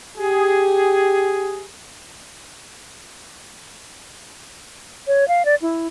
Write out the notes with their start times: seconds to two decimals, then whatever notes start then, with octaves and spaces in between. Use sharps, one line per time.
0.18 G4 G#4
5.07 C#5
5.28 F5
5.45 D5
5.62 E4